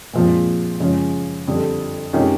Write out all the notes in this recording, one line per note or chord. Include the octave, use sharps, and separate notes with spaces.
A#2 F3 G#3 C4
C#3 F3 G#3 C#4
F2 D3 G3
C3 D#3 G#3 C#4